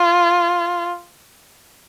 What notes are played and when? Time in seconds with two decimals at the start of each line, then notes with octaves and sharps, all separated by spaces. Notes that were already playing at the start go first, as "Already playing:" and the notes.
Already playing: F4